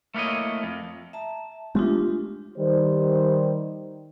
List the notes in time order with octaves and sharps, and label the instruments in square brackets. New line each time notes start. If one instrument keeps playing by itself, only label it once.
[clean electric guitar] A3 A#3 E4 C#5 D#5
F2
[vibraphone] E5 A5 A#5
[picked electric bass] G#3 A3 B3 [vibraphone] D4 F4 G4
[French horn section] D#3 G3 C5